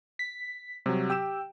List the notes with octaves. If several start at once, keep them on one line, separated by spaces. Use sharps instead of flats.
B6
C3 F#3 G3
G4 G5 E6 E7